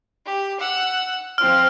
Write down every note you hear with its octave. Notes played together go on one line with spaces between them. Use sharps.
G4
F#5 E6
F3 C4 F4 F6